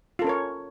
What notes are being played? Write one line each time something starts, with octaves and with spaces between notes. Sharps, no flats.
C#4 F4 A4 A#4 C#5